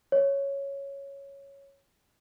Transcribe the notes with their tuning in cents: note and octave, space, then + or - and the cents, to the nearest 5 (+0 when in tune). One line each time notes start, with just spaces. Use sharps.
C#5 +0